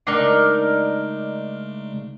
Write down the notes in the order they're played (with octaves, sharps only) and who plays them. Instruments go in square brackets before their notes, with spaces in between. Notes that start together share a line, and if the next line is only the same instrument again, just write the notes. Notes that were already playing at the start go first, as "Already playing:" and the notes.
[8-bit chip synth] C#3 G#3 A3 [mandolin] D4 D#4 A#4